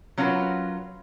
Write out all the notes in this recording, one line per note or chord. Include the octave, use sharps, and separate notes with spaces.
F#3 C#4 F4 F#4 A#4 B4